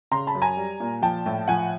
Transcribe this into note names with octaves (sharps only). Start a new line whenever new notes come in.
C#3 A#5 C6
A5 B5
F#2
G#5 A#5
G3
A#2
F3 G5 A5
A2
F3 F#5 G#5